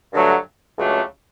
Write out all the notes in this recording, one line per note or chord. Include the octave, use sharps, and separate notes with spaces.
G2 D3 F#3 A3
C#2 C#3 F#3 A3 D4